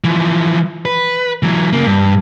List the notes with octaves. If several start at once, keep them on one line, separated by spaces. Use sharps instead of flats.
E3 F3
B4
E3 F#3
C#3 A#3
G2